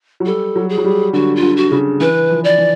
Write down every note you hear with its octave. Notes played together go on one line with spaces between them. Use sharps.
F#3
G3 A4
F#3
G#4
F#3
G3
D3 F#4
F4
D3
F#4
C#3
E3 B4
F3
D5
E3